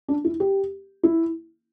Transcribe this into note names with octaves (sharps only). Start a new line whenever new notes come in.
D4
E4
G4
E4